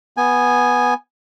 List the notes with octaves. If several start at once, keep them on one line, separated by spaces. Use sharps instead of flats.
B3 G#5